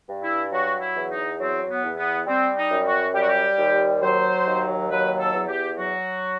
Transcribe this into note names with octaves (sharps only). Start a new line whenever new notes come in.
G2
E4
F#3 F#4
E4
E2
D#4
F#3 C4
B3
E2
B3
G3 C4
D#4
F#2
F#4
G3 G4
F#4
G4
D#2
F#3 C5
D#2
F#3 B4
A4
E2
G4
F#3 F#4